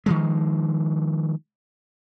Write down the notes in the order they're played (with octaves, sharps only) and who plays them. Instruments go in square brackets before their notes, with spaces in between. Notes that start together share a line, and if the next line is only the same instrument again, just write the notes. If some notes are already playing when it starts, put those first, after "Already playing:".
[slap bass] D#3 F3 G#3